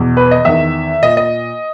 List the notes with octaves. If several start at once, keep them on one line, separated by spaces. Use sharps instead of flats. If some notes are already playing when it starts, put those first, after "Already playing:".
Already playing: E2 B2
B4
D#5
E2 D#3 E5
A#2 D#5
D#5